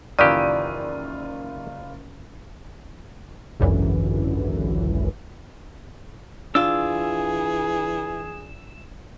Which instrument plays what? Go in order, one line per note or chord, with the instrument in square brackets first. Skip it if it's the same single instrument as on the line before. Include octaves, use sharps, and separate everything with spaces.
[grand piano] F#1 F4 D#7 [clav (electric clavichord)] D#3 E3 G4 [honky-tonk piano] D5
[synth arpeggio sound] G#1 C#2 F#2 D3 E3
[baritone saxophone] E3 [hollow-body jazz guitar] D4 F4 [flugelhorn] G#4 [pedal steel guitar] E6